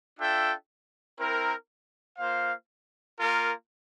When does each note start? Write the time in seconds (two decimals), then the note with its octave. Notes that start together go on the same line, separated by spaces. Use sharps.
0.18 D4 F4 A4 E5 G5
1.18 C4 E4 A#4
2.17 A#3 F4 C5 F5
3.16 A#3 F4 A#4